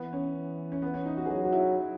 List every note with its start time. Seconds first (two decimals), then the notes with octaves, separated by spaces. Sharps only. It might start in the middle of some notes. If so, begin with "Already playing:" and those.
Already playing: E3 B3
0.13 C#4
0.72 C#4
0.82 B3
0.94 C#4
1.06 D#4
1.17 F#4
1.26 G#4
1.29 F#3 F#4
1.45 F#4
1.53 E4